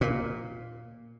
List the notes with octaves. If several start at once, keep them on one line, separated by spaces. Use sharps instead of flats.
A#2